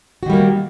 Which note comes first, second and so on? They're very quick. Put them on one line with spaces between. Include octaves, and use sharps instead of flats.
F#4 D#3 G3 A#3